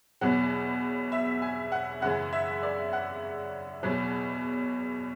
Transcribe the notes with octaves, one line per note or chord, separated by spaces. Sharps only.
E2 B2 F#3 F#5
E5
G#5
F#5
F#2 C#3 E3 F#5
E5
D5
F#5
E2 B2 F#3